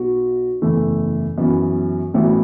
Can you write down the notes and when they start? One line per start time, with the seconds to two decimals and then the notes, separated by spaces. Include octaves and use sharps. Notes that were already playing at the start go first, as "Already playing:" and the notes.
Already playing: B1 B2 B3 F#4
0.62 F#1 E2 E3 A3
1.38 F#2 E3 B3 F#4
2.14 A1 A2 E3 B3 F#4